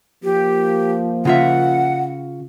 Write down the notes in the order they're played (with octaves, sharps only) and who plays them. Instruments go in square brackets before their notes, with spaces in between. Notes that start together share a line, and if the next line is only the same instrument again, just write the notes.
[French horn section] F3 A#3 [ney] G4
[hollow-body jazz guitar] C#3 F4 E5 [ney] F#5